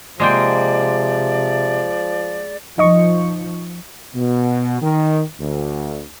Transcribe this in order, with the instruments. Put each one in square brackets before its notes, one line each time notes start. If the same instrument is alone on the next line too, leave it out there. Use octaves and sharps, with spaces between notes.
[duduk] C3 [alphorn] F3 [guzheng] G#3 A#3 G5 [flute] D5
[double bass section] F3 [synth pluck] D#4 D#5 C#6
[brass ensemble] B2
D#3
D2